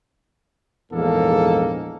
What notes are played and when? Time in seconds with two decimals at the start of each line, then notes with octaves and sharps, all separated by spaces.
0.92 A#1 E2 G#2 A#3 A4